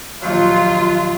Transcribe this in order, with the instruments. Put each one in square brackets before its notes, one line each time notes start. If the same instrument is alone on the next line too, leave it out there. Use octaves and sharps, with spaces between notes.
[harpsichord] A#1 D#2 F#3 [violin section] F4